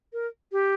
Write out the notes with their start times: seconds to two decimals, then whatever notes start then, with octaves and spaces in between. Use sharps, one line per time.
0.13 A#4
0.52 G4